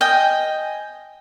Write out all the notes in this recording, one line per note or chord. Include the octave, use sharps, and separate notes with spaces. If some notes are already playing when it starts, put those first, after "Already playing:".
D#5 G5 G#5